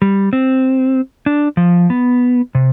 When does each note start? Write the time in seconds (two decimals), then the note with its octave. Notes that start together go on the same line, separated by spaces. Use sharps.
0.02 G3
0.33 C4
1.26 D4
1.57 F3
1.90 B3
2.55 C3